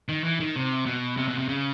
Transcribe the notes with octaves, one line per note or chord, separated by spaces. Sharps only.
D#3
E3
D#3
C3
B2
C3
B2
C3
C#3